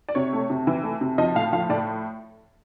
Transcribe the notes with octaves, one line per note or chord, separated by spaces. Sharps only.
D5
C3 C#5
A3
C3
E3
A3
C3
F3 D#5
A2 F5
F3 F5
A2 D5